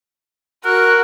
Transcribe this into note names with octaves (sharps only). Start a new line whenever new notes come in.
F#4 A#4 F#6